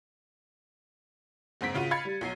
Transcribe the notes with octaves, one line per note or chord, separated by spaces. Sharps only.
F#1 G#2 C4 B6 D7
C#3 F4 F#4 D#7
F5 B5 G#6 A6 C#7
G3
B1 F#3 C7 D#7